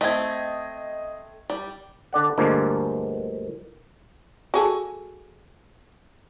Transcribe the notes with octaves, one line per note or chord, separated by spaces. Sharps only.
A3 C4 D#5 G#6
G3
D3 D5 F#5
D2 G2 D3 F3 G#3 A#3
F#4 G#4 A4